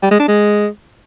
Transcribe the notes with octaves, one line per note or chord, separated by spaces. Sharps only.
G3
G#3
D4
G#3